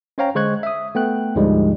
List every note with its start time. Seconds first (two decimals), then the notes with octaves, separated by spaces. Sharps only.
0.18 C#4 C5 C#5 F5 G5 A#5
0.35 D3 G#3 C5 C#6 F#6 G#6
0.63 E5 D#6
0.95 A3 B3 G5 F#6
1.35 D2 G#2 D3 F3 G3 G#3